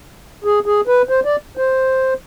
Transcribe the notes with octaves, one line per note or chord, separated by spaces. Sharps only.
G#4
G#4
B4
C5
D5
C5